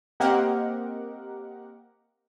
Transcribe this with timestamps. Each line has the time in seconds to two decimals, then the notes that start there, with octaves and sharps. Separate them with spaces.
0.20 A#3 C4 G4 A#4 D#5 F#5